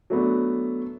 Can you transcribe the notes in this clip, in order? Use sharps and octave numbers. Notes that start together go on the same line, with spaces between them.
F#3 A3 B3 D4